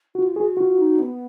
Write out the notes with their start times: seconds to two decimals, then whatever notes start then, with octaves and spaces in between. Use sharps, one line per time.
0.15 F4 F#4
0.35 F#4 G#4
0.57 F4 F#4
0.78 D#4
0.99 B3